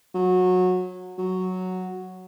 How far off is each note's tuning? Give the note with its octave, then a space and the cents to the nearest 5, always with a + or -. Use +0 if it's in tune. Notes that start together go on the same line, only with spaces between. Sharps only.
F#3 -20
F#3 +0